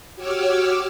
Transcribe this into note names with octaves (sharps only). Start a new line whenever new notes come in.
F#4 G4 C#5 D6 E6 F6